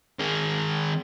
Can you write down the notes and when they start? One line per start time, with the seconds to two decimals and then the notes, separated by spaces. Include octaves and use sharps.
0.19 D#3 G#4